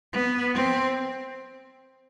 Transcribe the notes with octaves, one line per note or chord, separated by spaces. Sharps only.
B3
C4